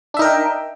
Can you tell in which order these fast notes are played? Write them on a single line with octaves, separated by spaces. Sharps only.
D4 E5 D#4 A#4 G5